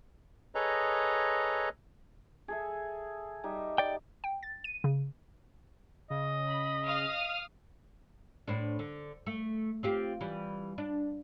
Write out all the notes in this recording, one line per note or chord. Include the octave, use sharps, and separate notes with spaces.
G#4 A4 B4 C#5 D#5 A#5
G#4 A4 E5
G3 D#4 E5
D5 G5
G5
A6
D#7
C#3
C#3 D#5
B5
F5 D#6 F6
A2 C4 D4
D3
A3
C4 F4 G4
E3 G3
D4